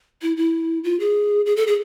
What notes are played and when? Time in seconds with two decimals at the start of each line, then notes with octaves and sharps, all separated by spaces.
0.22 E4
0.37 E4
0.84 F4
1.00 G#4
1.46 G#4
1.56 A4
1.67 G#4